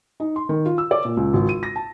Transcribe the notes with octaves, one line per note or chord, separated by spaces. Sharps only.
D#4
C6
D#3
F4
E6
D5
A#2
C#2
G#1
D#7
A#6
A5